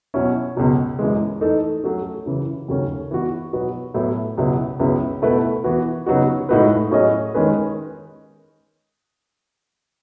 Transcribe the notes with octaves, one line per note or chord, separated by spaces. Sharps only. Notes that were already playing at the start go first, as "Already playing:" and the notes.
B2 F#3 C#4 E4
C#2 B2 F#3
F#2 E3 G#3
E3 A3 D#4 A4
F#3 A3 C#4 F#4
F#2 C#3 E3
D#2 C#3 F#3 A3 C#4
E3 B3 F#4
B2 F#3 B3 F#4
A2 F#3 B3 E4
C#2 B2 F#3 B3 E4
C#2 C#3 F#3 B3 E4
B2 A3 E4 B4
E3 B3 F#4
C#3 F#3 B3 D#4 F#4
A2 G#3 D#4 F#4 B4
A2 F#3 C#4 G#4 D#5
D#3 G#3 C#4 G#4 B4